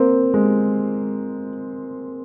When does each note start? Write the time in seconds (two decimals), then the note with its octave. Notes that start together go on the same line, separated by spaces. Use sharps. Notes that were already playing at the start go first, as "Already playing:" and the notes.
Already playing: A#3 C4
0.34 G#3